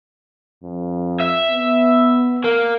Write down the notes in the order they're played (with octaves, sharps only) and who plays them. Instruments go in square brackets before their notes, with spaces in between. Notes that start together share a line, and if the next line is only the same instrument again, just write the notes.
[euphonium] F2
[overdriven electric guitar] E5
[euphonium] B3
[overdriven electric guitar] A#3